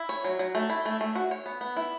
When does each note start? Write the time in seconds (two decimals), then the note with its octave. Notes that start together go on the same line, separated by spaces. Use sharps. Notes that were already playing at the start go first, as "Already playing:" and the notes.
Already playing: E4
0.09 C#5
0.24 F#3
0.39 F#3
0.55 A3
0.70 E4
0.85 A3
1.01 A3
1.15 F#4
1.31 C#5
1.46 B3
1.61 B3
1.77 E4